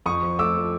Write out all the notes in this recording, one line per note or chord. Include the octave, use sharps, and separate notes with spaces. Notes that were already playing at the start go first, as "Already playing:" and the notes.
F2 C#6 D#6
F3
A3 D6 E6
F3